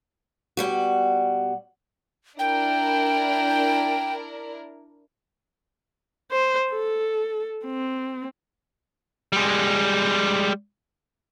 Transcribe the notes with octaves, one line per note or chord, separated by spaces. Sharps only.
B2 G3 F#4
D4 E4 A#4 G5
C5
A4
C4
G3 G#3